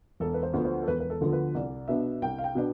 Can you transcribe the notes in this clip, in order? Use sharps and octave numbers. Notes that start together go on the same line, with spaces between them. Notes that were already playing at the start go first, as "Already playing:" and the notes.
E1 A4
B4
C5
D2 D3 F3 B3
C5
A4
E1 B4
B4
A4
D2 D3 F3 B3
B4
C2 D5
B2 B3 D4 E5
C2 G5
F5
G5
B2 B3 D4